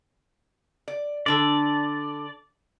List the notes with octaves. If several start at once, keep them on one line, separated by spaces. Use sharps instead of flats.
D5
D3 D4 A4 D5